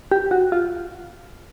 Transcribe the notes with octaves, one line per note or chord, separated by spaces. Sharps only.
G4
F#4
F4